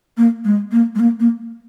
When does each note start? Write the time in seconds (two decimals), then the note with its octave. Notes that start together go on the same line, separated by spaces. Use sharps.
0.17 A#3
0.44 G#3
0.72 A#3
0.95 G#3
1.00 A#3
1.20 A#3